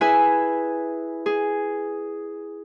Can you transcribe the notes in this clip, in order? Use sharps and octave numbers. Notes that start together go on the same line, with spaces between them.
E4 G#4 B4 E5 G#5
G#4